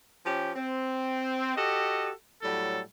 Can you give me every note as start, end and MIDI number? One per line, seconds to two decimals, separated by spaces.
0.25 0.51 53
0.25 0.51 61
0.25 0.51 67
0.56 1.54 60
1.56 2.10 66
1.56 2.10 67
1.56 2.10 69
1.56 2.10 75
2.43 2.80 45
2.43 2.80 54
2.43 2.80 55
2.43 2.80 69